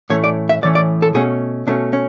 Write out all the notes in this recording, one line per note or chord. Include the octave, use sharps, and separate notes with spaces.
A2 E3 A3 C#4 C#5
D5
E5
A2 E3 A3 C#4 D5
D5
A4
B2 A3 C#4 G#4
B2 A3 C#4 D4
C#4